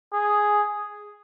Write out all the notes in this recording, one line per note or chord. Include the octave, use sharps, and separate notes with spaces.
G#4